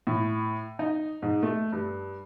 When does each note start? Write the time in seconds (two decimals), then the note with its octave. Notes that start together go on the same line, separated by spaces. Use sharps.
0.07 A2
0.79 D#4
1.22 G#2
1.43 A3
1.72 G2